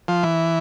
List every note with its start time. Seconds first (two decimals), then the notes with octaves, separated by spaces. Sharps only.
0.08 F3
0.23 E3